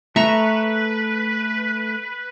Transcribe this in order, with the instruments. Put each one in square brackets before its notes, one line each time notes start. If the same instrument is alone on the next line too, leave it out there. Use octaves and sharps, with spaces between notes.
[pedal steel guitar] A3 A#5 [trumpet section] B4 [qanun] E5 C#6